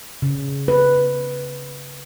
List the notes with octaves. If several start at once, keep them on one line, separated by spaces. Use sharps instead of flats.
C#3
B4